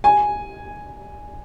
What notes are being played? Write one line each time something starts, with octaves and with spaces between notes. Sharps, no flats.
G#5